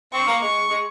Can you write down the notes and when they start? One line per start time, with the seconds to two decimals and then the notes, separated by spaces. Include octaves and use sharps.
0.13 C4 C#6
0.27 A#3
0.41 G#3 C#6
0.69 G#3